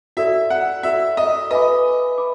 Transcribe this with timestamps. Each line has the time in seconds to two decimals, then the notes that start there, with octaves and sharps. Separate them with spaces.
0.17 F#4 A4 D5 E5
0.50 F#5
0.83 F#4 A4 D5 E5
1.17 D#5
1.51 B4 D#5 E5 G#5 B5 D6
2.18 B5 D6